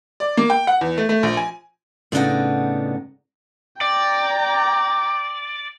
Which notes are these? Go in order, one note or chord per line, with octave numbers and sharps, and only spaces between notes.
D5
A#3
G5
F#5
E2
A3
A3
A#1
G#5
A2 C#3 B3 D4 D#4 F#5
D5 G5 A#5